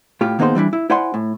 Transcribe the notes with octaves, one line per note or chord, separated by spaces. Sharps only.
A2 F4 G4
D#3 A#3 B3 D#4 G#4 C5
E3 G3 D4 E4
E4
E4 C5 D5 F#5 G#5 C6
A2